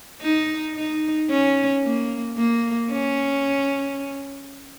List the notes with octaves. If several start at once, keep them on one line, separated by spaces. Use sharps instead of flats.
D#4
D#4
C#4
A#3
A#3
C#4